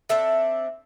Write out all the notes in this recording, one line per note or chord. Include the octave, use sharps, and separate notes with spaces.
C4 D4 A4 E5